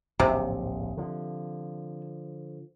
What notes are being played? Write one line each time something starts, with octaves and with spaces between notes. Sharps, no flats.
D1 A#1 G#2 C3
D3 F3